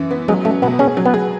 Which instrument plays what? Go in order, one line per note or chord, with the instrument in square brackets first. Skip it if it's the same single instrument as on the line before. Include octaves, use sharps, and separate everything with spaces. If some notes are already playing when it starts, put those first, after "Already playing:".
Already playing: [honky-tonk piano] F#2 E3
B3
[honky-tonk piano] F#3 [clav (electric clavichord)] G#3
[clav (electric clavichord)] A3 [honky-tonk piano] C#4
[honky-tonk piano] B2 [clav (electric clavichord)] B3
[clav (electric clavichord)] C#4 [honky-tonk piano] G#4
[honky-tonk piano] F#3
[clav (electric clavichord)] B3
[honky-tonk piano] G#4